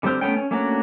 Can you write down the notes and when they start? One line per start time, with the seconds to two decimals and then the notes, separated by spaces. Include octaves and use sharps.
0.03 D3 G3 C4 C5 F6
0.21 A3 B3 C#4 G5
0.37 C#4
0.51 A3 A#3 C#4 D4 F#4